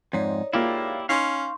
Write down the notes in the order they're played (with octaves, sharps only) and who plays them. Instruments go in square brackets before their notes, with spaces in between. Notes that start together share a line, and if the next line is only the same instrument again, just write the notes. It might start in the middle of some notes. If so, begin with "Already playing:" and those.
[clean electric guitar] F2 G#2 [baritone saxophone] D#4 [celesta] C#5 D5
[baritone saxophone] G#2 [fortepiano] A#3 F4 [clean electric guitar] E4 G4
[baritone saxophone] C#4 [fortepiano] D#4 [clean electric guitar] F5 [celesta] C6 C#6